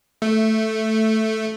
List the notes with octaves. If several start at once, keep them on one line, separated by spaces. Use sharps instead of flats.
A3